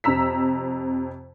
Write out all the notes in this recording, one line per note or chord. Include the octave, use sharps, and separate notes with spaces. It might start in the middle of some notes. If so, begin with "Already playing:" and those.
F2 C3 A#5 E6 B6